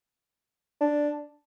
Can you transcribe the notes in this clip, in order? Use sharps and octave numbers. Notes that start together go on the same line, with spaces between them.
D4